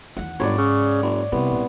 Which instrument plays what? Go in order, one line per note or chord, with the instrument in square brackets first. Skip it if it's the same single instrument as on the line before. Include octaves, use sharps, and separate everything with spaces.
[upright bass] E2 D#3 [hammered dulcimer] F#5
[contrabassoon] G1 [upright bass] G#2 [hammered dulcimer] C#5 D5
[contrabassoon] C#3
F#1
[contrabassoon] C2 [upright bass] C3 [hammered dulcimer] B3
[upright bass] A#1